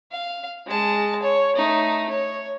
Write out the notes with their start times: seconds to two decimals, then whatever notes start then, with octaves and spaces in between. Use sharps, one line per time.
0.12 F5
0.67 G#3 A5
1.22 C#5
1.56 A3 D#4
2.09 C#5